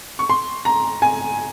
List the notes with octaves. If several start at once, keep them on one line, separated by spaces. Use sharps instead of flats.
C#6
C6
A#5
G#5